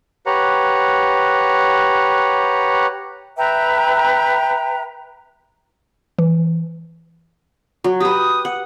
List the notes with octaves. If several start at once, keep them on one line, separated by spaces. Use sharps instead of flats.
G4 B4 C#5 F#5 A#5
B4 E5 G5 A#5
E3
F#3
G4 B4 D#6
F#5